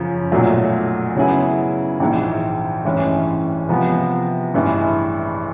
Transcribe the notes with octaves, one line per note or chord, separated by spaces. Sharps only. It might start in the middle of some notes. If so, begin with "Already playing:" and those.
Already playing: F#2 C#3 F3
B1 A#2 F#3 A3
C#3 F#3 B3 E4 G#4
A#1 G#2 E3
A1 G2 E3 G#3 C#4
C3 F3 G#3 B3
A1 G2 E3 G#3